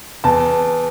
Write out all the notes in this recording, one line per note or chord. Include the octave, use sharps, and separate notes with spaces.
E2 A5